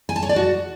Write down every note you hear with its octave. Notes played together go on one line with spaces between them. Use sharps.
G#5
A5
C#5
D5
F#4